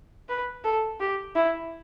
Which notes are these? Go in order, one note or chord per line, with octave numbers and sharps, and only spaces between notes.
B4
A4
G4
E4